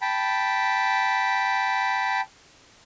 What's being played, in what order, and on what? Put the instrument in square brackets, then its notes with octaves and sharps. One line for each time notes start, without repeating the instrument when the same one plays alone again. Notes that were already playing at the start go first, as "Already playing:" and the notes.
[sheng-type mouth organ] G5 A5 B5